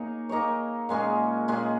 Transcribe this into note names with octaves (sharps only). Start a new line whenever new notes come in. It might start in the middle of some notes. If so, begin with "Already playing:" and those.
Already playing: A#3 D#4 G#4 C#5
A#3 D#4 G#4 C#5
A#2 G#3 C#4 G#4
A#2 G#3 C#4 G#4